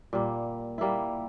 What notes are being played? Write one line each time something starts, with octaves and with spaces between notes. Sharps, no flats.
A#2 G3 A#3
G3 A#3 E4